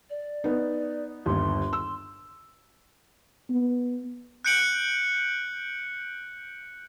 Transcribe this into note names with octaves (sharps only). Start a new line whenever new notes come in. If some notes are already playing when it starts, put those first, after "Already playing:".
D5
B3 D#4
G1 D#2 C6
E6
B3
F#6 G6 C#7 D7 F#7